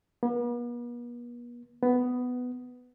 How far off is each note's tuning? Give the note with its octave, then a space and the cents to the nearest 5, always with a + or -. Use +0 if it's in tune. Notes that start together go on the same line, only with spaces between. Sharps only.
B3 -45
B3 +10